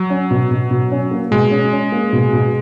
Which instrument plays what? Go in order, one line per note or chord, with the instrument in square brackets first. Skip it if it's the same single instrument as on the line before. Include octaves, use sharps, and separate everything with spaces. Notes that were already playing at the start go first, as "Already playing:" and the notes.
Already playing: [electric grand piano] F#3
[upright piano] C#4
B2
B2
B2
C#4
A#3
[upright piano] B2 [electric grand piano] G#3
[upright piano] C#4
C#4
A#3
B2
B2